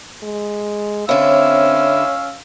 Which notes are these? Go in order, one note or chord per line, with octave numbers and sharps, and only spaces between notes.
G#3
D3 C4 C#4 E4 C#5 F5 E6